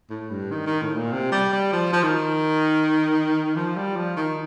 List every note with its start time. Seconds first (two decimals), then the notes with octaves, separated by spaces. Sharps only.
0.10 A2
0.30 G2
0.51 D#3
0.66 D#3
0.82 A2
0.96 A#2
1.12 C3
1.32 G3
1.53 G3
1.73 F3
1.93 F3
2.03 D#3
3.56 F3
3.77 G3
3.96 F3
4.17 D#3